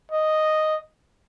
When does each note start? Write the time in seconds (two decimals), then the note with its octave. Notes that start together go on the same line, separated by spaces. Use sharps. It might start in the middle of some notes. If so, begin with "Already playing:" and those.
0.12 D#5